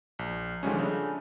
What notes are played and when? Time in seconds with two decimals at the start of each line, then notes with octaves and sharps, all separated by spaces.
0.19 A#1
0.63 D3 D#3 F3 G3 G#3 C#4
0.79 C#3 A3 D4